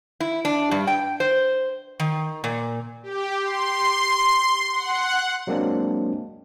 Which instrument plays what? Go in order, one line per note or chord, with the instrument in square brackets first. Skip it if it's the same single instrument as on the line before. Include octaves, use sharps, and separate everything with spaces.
[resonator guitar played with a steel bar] E4
D4
G2
G5
C5
D#3
A#2
[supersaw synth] G4
C6
F#5
[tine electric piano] F#3 G#3 A#3 C4 D4